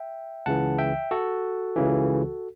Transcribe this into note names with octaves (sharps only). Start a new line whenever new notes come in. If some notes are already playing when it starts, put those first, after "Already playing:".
Already playing: E5 G5
C#2 C#3 E3 F#5 A5
E5 G5
F#4 A4
C#2 C#3 E3